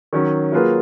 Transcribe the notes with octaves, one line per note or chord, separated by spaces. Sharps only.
D#3 F#3 C#4
F#3 A#3 F4 G#4 B4